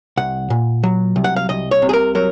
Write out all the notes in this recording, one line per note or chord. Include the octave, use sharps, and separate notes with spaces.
C2 F#5
A#2
F#3
C2
F#5
F5
C2 D#5
C#5
C3
G#4
A#4
F#3 A#4